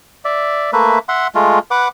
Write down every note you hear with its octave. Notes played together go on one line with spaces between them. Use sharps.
D5 E5
A3 A#3 B4 E5
E5 F#5 C6
G#3 A3 F4
B4 F#5 D6